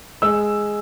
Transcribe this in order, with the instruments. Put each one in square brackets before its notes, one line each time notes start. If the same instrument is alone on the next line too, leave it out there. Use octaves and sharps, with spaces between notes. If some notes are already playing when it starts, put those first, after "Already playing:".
[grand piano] G#3 E6